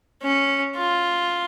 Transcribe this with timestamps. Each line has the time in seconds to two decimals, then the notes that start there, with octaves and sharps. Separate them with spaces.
0.23 C#4
0.75 F4